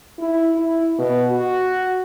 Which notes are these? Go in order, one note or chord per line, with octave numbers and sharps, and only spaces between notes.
E4
E4
B2
F#4